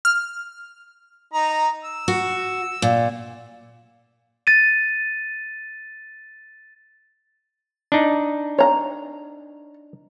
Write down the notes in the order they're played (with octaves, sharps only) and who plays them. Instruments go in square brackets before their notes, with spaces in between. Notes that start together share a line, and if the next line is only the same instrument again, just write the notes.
[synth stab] F6
[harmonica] D#4 A#5
E6
[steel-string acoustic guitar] F#4
A#2
[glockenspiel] A6 D#7
[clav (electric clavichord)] D4 D#4
[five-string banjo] C#5 A#5